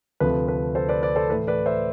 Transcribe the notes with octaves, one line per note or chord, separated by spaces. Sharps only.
D2 C3 F3 A3 B4
B4
A4 C5
B4 D5
B4 D5
A4 C5
A2 E3 A3 B4
B4 D5
C5 E5